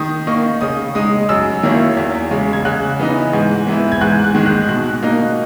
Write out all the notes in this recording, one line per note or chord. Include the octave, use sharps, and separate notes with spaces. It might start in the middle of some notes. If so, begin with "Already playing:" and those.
Already playing: D#3 D#6
A#3 D#4 C#6
C#3 D#6
G#3 D#4 D#6
F#2 E6
D#3 A#3 C#4 E4
E2
C#3 G#3
G#6
C#3 F#6
E3 B3 D#4
G#2
E3 B3 E4
G#6
G#2 F#6
F#6
D#3 G#3
F#6
B2 F#6
A#3 D#4